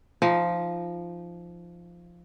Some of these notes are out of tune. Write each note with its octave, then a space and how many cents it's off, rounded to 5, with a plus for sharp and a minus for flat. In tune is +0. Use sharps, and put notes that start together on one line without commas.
F3 -10 D#4 +0